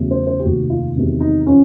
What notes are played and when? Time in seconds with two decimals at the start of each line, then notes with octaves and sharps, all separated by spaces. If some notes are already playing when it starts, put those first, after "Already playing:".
Already playing: E2 C#3 F#3 A3
0.11 C5
0.27 C5
0.40 G4
0.45 F1 D#2 D#3 F#4
0.70 F4
0.96 E2 C3 D#3 F#3
1.20 D#4
1.46 F3 C#4